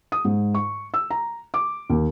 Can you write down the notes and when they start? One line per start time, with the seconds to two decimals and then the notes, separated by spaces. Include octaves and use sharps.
0.12 D#6
0.25 G#2
0.55 C#6
0.94 E6
1.10 A#5
1.54 D6
1.90 D#2